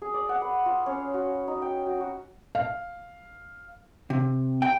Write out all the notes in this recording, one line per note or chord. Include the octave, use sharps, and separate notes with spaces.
G#4
D5
F#5
B4
F4
C#4
F#4
D#4
G5
F#4
F#4
F5
C3
G5